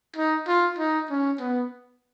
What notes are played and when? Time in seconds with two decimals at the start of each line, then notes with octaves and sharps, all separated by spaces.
0.16 D#4
0.48 F4
0.78 D#4
1.10 C#4
1.39 B3